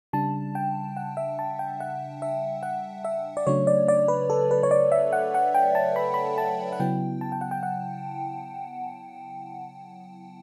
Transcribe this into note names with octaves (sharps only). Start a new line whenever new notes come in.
C#3 G3 D4 A5
G5
F#5
E5
A5
G5
F#5
E5
F#5
E5
D5
C#3 F#3 A3 D4 C#5
D5
D5
B4
A4
B4
C#5
D5
E5
F#5
F#5
G5
A5
B5
B5
A5
F#5
C#3 F#3 B3 E4 G5
A5
G5
F#5
G5
F#5